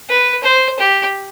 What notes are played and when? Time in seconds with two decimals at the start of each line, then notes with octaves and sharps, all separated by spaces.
0.09 B4
0.43 C5
0.79 G4